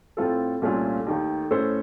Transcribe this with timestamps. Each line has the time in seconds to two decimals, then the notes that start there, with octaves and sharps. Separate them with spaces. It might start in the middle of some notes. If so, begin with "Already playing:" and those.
0.17 A2 A3 C4 F4 A4
0.62 C2 A#2 A3 C#4 F4
1.06 D#2 D#3 A3
1.51 A2 A3 C#4 A4 C5